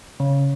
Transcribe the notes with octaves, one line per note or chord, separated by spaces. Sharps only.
C#3